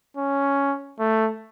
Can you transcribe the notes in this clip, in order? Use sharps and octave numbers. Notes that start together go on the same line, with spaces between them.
C#4
A3